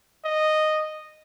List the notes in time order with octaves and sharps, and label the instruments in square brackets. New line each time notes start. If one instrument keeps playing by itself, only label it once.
[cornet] D#5